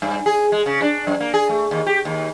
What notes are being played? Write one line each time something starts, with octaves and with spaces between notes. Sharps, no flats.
G2
G#4
G#3
C#3
D4
F#2
A#3
G#4
A3
D#2
G4
D#2